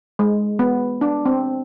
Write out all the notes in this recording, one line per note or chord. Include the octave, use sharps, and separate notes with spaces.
G#3
B3
D4
C4